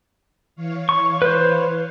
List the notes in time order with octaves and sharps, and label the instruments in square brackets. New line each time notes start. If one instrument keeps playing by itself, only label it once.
[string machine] E3 C#5 F5
[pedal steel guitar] C#6
B4 C5